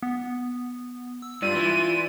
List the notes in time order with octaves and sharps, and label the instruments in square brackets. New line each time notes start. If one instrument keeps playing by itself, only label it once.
[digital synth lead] B3
E6
[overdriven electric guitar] G2 [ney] F4 [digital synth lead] D5 [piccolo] D#7
[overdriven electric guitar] E3